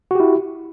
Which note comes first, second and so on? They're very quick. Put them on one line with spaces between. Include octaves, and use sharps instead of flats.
F#4 G4 E4